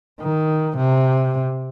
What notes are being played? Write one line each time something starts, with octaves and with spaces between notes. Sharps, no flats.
D#3
C3